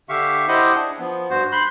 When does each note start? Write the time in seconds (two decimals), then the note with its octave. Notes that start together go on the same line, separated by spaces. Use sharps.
0.09 D3 G4 E5 F5 C#6
0.48 E4 G4 C5 D#5 F#5
0.75 D4 G#4
0.99 F3 B3
1.30 G2 F#4 C5
1.52 B5 C6 F#6 G6